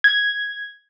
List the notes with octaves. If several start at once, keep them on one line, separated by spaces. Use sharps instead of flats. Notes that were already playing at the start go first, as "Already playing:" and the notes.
G#6